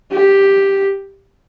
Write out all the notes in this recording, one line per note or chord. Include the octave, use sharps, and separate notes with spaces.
G4